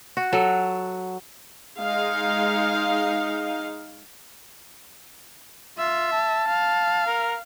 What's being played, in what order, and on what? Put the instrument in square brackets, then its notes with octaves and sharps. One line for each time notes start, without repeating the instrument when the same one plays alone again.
[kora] F#4
F#3 A4
[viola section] G#3 D#4 F5
[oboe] F4 [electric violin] E5
[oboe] A5
[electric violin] F5
[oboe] A#4